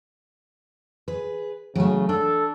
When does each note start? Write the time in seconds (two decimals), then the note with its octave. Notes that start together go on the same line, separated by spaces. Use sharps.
1.08 G#4 B4
1.75 C#3 F#3 A3
2.09 D4 A4